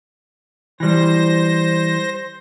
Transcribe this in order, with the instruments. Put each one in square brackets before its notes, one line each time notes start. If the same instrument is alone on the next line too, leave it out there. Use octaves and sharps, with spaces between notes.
[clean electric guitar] E3 G3 [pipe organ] C5 A#6